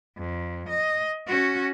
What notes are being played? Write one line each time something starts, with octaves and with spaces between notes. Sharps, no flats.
F2
D#5
C#4 F#4